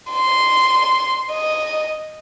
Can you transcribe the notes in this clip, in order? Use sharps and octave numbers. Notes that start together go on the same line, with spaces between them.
C6
D#5